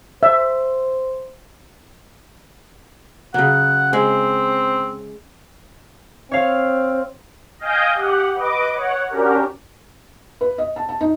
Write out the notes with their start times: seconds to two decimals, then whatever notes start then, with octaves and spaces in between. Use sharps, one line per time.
0.23 C5 E5
3.34 C#3 F#3 F#5
3.93 G#3 C4
6.31 C4 C#5 F5
7.59 D#5 F5 G5 G#5 D#6 G6
7.94 G4 F#5
8.35 B4 D#5 D6
8.73 C#5 F#5
9.10 C#4 D4 F#4 G4 A#4
10.41 B4
10.58 D#5
10.76 A5
10.89 A5
11.01 D#4